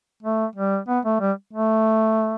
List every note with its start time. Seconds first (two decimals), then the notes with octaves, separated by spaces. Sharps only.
0.23 A3
0.55 G3
0.88 B3
1.05 A3
1.21 G3
1.54 A3